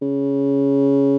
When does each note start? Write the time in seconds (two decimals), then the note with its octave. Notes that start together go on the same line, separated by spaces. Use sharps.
0.02 C#3